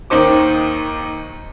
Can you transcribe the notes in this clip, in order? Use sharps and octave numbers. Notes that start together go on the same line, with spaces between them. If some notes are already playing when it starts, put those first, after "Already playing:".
D#2 D#3 D#4 C5 D6